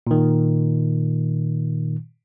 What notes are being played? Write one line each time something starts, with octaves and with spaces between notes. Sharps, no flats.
A#2 D#3